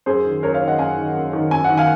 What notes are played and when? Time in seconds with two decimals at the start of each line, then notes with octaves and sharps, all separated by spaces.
0.06 F#2 G#4 C5
0.25 D#3
0.43 F#2 A#4 C#5
0.54 C#5 F5
0.62 D#3
0.68 D#5 F#5
0.79 F#2 F5 G#5
0.97 D#3
1.15 F#2
1.33 D#3
1.51 F#2 G#5
1.64 D#3 F#5
1.77 F5 G#5